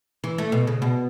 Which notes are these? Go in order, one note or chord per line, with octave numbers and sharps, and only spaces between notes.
E3
A3
B2
C#3
B2